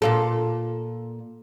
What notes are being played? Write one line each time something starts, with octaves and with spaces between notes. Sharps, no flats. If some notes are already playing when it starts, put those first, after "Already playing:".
A#2 F4 A4